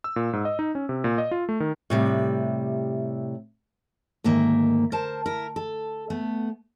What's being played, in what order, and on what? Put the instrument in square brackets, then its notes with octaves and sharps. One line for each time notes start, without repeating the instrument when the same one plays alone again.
[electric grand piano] E6
A#2
G#2
D#5
D#4
C#4
C3
A#2
D#5
F4
A3
D#3
[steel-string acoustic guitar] A2 C3 G3
D2 G#2 D#3 A#3 E5
A#4 C5 A5
E4 A#4
A4
A3 B3